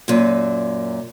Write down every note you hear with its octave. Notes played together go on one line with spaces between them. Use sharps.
F#2 A#2